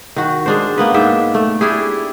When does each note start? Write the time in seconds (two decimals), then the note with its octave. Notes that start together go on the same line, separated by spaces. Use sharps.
0.16 D#3 F#4
0.46 G#3 D4 C5
0.78 A#3 B3 B4
0.94 G#2 D4 E5 G5
1.34 A3
1.61 D4 E4 G4 G#4